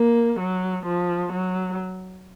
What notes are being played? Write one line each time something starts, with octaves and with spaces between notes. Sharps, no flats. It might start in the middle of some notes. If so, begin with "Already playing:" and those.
Already playing: A#3
F#3
F3
F#3